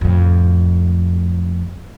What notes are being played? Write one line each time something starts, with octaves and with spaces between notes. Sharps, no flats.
F2 A2